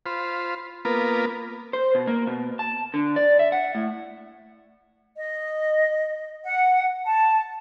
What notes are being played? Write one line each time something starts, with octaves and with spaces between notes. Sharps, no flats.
F4 C5 B5
A#3 B3 F4 A#4 B4
C5
B2
A#3
B2
A5
D3
D5
E5
F#5
A2
D#5
F#5
A5